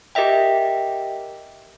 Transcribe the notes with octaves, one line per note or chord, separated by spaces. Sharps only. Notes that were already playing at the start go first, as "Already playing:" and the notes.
G4 A#4 D#5 E5 G5